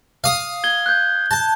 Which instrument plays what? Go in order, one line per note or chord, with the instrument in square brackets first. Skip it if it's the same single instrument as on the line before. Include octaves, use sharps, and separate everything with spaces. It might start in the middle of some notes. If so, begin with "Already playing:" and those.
[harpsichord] F5 D#6
[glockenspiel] G#6 G7
F#6 G6
[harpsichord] A5